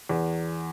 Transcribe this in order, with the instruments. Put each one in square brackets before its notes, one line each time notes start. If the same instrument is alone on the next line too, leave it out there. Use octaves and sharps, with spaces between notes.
[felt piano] E2